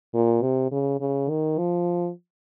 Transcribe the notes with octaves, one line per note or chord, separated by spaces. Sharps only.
A#2
C3
C#3
C#3
D#3
F3